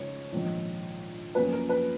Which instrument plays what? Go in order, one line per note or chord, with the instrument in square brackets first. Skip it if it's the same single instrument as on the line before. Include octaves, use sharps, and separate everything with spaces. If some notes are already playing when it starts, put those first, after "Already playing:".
Already playing: [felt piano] C#3 G#3 D#4 G#4 [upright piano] C#5
[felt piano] A#1 G#2 D#3
[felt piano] F#2 F3 A#3 C#4 F4 [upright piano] B4
[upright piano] A#4
B4